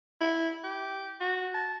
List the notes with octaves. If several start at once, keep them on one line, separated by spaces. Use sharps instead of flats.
E4
G4
F#4
A5